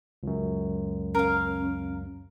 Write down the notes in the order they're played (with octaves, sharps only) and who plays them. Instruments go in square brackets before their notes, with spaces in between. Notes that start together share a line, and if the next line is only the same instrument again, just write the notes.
[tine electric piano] C#2 F#2
[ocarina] C#4 [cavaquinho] A#4 F5